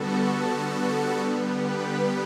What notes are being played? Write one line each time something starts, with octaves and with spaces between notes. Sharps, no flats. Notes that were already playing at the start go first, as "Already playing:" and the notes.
Already playing: D3 G3 B3 F#4 A4
G4 B4